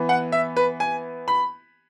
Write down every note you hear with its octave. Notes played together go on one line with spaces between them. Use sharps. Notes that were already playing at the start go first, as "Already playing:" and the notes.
Already playing: E3 B3
F#5
E5
B4
G#5
B5